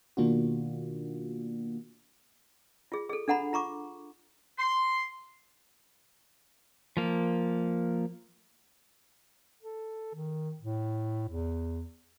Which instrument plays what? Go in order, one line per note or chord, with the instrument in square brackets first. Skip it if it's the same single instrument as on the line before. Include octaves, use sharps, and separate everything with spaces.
[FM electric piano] B2 D#3 A#3 D4 F4 F#4
[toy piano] F4 G#4
G#4 A4
D4 A4 F#5 A#5 B5
F4 A#5 C#6 D6
[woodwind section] C6
[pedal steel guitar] F3 A#3
[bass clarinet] A4
D#3
A2
E2